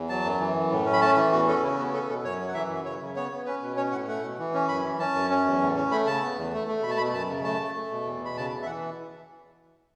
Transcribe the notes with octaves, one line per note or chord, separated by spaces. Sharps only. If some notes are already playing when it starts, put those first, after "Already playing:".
Already playing: E2
F#3 A5
F#2
E3
F#2
A2
C#4
B5
A3 A5
E3
E2 F#4
C#4 A4
F#4
C#3 E4
B3 F#4
C#4 A4
B2 A4
F#2 C#5
F#3
F#5
E3 E5
F#2
C#3 C#5
C#3
B3 C#5
B3
C#4 B4
B2
C#4 C#5
A2 F#5
A3 F#5
B2
E3
C#4
F#2 B5
E3
C#4 A5
F#2
C#4
E2
A2
C#4
A3 B5
C#3 A5
B3
E2
A3
A3
B2 B5
A5
B2 B5
F#2 A5
C#3
A3 A5
A3
A3
B2
E2
B2 B5
C#3 A5
E2
E5
E3 F#5